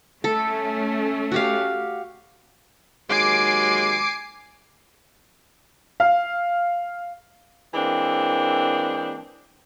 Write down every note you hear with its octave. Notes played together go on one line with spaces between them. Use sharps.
A3 C#4 A4
F#4 G4 F5
D#2 F#3 G#3 G#5 D6 C7 D7
F5
E3 G#3 A#3 C4 D4